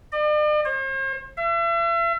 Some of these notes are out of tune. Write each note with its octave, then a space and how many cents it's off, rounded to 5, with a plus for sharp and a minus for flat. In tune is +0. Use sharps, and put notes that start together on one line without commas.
D5 +45
C5 +45
E5 +40